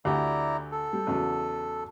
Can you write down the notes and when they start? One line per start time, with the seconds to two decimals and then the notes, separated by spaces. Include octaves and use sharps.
0.05 D2 E4 G4 D5 G#5 A#5
0.72 A4
0.93 G3
1.07 E2 C#3 F#3